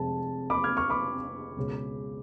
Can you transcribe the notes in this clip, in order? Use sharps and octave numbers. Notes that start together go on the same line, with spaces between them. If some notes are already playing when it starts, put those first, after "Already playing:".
Already playing: F1 F2 F3 G#3 A5
B5 D6
F6 G#6
C#6 F6
B5 D6
C#2 B2 G#3 C#4